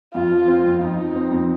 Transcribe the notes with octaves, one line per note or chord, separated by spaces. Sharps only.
F2 F4
F3
C4
F2
F2 D#4
F3
C4
F2